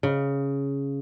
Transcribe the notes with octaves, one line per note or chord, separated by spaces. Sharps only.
C#3